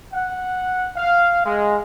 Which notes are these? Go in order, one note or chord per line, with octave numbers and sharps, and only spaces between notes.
F#5
F5
G#3